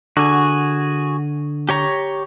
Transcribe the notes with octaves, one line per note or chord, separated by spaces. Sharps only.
D3 F#4 G#4
G4 C#5 A#5